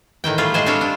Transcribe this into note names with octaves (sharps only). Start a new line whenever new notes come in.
A2 D#3 E3 G5
G3 A3 F4 G#4
A2 G#3 G#4 C5
G3 C4 D4 F4 C#5
D4